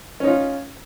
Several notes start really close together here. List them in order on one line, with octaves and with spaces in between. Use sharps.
C#4 D#4 F4